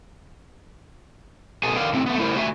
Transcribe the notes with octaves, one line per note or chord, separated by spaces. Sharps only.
B2 A3 G#4 A4 G#5
D3 A#4 F5 G5
A2 C4
A3 B3
A3 E4 A#4 C5
D3 A3 D4 F#4 E5 G#5